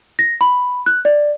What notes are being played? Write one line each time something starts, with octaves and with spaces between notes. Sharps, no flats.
A#6
B5
F#6
D5